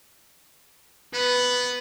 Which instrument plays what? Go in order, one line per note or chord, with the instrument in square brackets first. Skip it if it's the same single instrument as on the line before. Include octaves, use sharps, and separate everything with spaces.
[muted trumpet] B3 [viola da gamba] B4